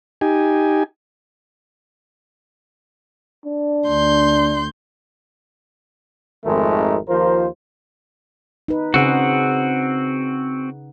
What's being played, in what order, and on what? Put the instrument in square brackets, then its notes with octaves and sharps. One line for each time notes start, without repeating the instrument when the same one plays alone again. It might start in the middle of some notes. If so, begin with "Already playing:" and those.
[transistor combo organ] D#4 G4 G#5
[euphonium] D4
[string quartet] D2 C6 G6
[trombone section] G#1 F2 D#3 G#3 A3 A#4
D#2 F3 F4 A#4 C5
[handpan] D#4 B4
[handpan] C#3 G#4 F#5 [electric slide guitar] C4 F#4